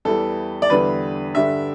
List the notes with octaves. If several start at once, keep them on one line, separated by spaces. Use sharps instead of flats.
E2 E3 G3 A4
D5
E2 D3 G3 B4
G2 D3 G3 E5